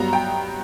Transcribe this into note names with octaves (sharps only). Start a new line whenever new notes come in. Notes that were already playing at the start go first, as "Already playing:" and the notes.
Already playing: G2 F#3 B3 A#5
G5